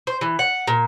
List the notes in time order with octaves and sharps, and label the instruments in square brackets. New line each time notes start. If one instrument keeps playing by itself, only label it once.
[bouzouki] C5
E3
F#5
A#2